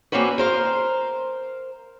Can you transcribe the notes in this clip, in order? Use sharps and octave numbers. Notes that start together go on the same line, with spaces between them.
D3 A#3 C4 C#4 F#4 B4
A#4 C5 F5